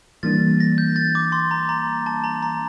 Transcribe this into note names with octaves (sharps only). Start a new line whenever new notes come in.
E3 G3 A#3 D4 A6
A#6
G6
A6
D6
C6
A#5
A#5
A5
A#5
A#5